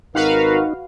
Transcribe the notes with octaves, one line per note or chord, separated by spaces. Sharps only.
G#1 D#4 F#4 A#4 B4 F5